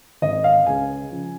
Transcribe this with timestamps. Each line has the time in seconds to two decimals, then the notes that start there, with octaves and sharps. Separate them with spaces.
0.22 G#1 G#2 D#3 D#5
0.44 F5
0.66 C#2 C#3 G#3 C#4 G#5
1.11 C#3 F3